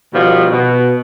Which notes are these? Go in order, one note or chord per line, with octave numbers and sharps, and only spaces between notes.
B2 D#3 F3 G3 B3
B2